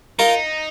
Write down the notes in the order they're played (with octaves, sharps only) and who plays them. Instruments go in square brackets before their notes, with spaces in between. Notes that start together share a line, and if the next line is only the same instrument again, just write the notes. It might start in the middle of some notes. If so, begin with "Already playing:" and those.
[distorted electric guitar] D#4 [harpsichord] F4 A#4